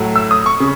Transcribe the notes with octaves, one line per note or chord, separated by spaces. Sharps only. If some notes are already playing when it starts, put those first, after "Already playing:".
Already playing: A2 F#3 A3
E6
D#6
C#6
C#3